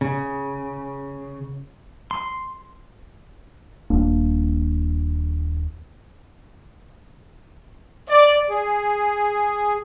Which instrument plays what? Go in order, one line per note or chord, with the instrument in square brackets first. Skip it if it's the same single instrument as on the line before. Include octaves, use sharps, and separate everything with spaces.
[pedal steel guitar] C#3
C6
[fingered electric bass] D#1 A#3 D4
[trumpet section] D5
[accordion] G#4